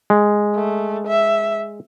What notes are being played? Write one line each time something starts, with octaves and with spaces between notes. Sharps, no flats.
G#3
A3
E5